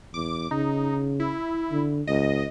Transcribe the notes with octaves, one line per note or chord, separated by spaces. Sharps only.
E2 D6
C#3 D#4
E4
D3
C#2 D#5